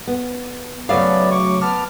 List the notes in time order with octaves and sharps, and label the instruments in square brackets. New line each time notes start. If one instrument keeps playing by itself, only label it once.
[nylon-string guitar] B3
[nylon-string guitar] C#3 C#5 F5 [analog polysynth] F#3 A3 [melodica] B3 D5
[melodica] C#6 D6
[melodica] B3 A5 D6 [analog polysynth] F6